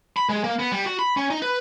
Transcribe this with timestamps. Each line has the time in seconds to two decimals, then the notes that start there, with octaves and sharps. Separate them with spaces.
0.17 B5
0.29 G#3
0.44 A#3
0.59 B3
0.72 G3
0.86 F#4
0.99 B5
1.17 C#4
1.30 D#4
1.42 B4